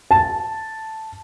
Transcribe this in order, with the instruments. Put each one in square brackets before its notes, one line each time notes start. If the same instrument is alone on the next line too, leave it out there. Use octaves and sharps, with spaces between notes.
[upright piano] A5